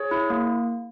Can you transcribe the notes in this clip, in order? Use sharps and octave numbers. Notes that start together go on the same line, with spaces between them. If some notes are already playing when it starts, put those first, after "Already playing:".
Already playing: G#4 C#5
E4
A#3